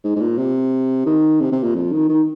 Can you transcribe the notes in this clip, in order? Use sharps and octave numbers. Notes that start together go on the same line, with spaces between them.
G#2
G#2
A#2
C3
D#3
C3
C3
A#2
F2
D#3
D#3